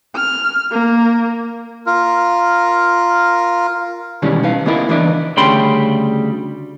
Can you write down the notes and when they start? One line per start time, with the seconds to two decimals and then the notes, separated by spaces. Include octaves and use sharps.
0.16 F6
0.71 A#3
1.86 F4 A#4
4.22 B2 D#3 E3 G3 G#3 C#4
4.43 D#4 B4 F5
4.66 C#3 A#3 B3 D#4 E4 A#4
4.89 E3 A#3 D4 D#4 D5 E5
5.37 D2 C#3 G3 G5 B5 C6